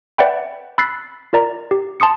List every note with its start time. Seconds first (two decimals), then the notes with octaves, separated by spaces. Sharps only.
0.18 B4 D5 E5 F#5 G5 B5
0.78 B5 E6 F#6 A6 B6 C7
1.33 F4 A#4 D5 A#5
1.71 G4
2.00 A5 C6 D#6 C#7